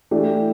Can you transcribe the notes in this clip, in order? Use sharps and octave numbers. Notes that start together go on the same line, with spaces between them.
E3 A3 D4 G4